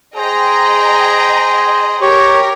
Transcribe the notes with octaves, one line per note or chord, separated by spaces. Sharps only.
G#4 C5 D#5 G5 A#5
G4 A#4 C#5